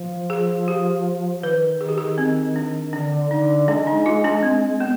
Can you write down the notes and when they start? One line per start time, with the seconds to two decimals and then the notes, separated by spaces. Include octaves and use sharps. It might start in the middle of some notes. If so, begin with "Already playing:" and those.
Already playing: F3
0.30 G#4
0.68 G4
1.43 D#3 B4
1.81 G#4
1.89 G4
1.98 G#4
2.18 C4
2.56 D4
2.93 D3 D4
3.31 D3 D#4
3.68 G#3 D4
3.87 D#4
4.06 F4
4.25 D4
4.43 C4
4.80 B3